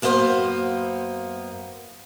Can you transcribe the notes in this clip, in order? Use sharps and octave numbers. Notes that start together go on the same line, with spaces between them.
F#2 A#3 B3 D#4 C5 F5